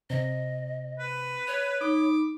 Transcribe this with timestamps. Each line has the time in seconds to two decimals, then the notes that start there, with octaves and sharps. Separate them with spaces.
0.10 C3 D#5
0.99 B4
1.48 C#5
1.81 D#4 B5 D6